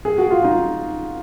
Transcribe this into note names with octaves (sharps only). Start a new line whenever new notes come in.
G#4
F#4
F4
D#4